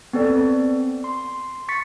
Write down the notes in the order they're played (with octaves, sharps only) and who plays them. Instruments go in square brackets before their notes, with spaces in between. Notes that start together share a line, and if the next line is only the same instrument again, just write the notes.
[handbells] B3 C4 A4 D5
C6
C#6 A6 B6 C#7